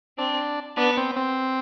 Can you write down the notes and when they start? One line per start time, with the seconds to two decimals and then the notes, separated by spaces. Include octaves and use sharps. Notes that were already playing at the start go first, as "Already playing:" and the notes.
0.18 C4 D4
0.77 B3 D4
0.97 C4
1.16 C4